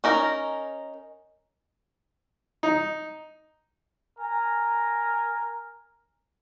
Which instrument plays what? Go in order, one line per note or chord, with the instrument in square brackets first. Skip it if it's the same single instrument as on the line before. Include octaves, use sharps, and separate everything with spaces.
[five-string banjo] C#4 D#4 A#4
[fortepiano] D#4
[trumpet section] A#4 G#5 A#5